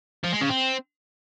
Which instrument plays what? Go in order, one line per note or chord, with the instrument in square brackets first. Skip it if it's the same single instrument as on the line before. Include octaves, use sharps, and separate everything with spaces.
[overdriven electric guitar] F3
G#3
C#3
C4